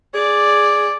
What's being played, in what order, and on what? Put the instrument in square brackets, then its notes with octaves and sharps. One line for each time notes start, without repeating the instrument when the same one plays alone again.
[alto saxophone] G#4 [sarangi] D5